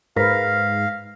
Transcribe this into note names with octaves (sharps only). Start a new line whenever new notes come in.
G#2 A#4 B4 F5 F6 A#6 B6